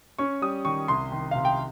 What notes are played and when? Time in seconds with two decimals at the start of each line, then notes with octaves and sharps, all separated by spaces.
0.19 C#4 C#6
0.42 G3 D#6
0.65 D#3 C#6
0.88 C2 C6
1.11 D#3
1.31 C3 F5
1.45 G5